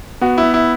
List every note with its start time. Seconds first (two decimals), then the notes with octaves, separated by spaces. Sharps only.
0.21 B3 F#4
0.38 E4
0.43 B3
0.54 E4